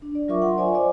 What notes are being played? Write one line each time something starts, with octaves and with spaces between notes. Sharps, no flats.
D4
D5
F#3 F4 A#4 E5 C#6 D6
F#5 C6
C5 D5 E5 F#5 G#5
D5 D#5 D6